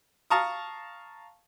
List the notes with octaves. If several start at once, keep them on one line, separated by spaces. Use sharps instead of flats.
F5 A5 A#5 C#6 D#6